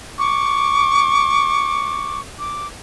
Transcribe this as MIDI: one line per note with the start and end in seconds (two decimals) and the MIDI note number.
0.18 2.21 85
0.18 2.19 86
2.39 2.67 86